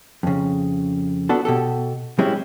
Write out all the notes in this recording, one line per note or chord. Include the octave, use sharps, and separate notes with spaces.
F2 C#3
B3 D4 F#4 A4
B2 G4 A4
F#3 G#3 C4 C#4 E4 G4